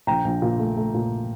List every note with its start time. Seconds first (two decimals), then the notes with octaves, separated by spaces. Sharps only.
0.07 A#1 G5 A#5
0.24 A#1
0.42 A#2
0.59 A3
0.76 A3
0.94 A#2